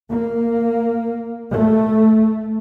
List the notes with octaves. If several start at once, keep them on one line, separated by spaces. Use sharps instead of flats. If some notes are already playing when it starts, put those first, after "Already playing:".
A#3
A3